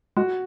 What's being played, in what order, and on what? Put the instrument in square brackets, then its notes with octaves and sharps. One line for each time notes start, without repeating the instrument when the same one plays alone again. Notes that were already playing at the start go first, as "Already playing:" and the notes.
[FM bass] G#3 [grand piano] F#4